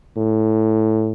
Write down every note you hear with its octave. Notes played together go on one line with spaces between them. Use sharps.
A2